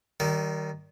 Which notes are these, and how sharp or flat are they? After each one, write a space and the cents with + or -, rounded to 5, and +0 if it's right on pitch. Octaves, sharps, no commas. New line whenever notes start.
D#3 +0 G3 -35